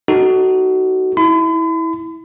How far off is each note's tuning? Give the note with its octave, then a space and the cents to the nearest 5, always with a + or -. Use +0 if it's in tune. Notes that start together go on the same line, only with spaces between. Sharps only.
D#4 +0 F#4 +20 A4 +0
E4 -20 B5 +45